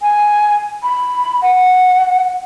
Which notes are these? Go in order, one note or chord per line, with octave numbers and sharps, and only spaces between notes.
G#5
B5
F#5